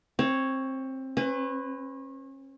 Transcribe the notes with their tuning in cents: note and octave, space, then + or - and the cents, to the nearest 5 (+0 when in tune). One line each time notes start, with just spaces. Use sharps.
C4 +20 C#5 +0
C#4 -35 B4 +25